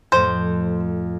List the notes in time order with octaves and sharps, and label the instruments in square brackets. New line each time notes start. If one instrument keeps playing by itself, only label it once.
[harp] F2 A2 [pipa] C5